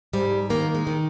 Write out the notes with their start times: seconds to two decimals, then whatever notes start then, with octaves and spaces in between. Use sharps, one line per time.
0.13 G#2 G3
0.50 D#3 A#3
0.75 G#3
0.87 D#3